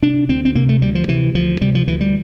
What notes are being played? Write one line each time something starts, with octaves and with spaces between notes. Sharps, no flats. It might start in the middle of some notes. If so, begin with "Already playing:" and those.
C3 D4
D2 C4
C4
C3 A#3
A3
D2 G3
F3
C3 E3
D2 F3
C3 G3
F3
D2 E3
G3